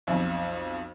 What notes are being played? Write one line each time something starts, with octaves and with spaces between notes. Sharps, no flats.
B1 F2